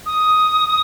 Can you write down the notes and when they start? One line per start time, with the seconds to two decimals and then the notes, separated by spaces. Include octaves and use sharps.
0.06 D#6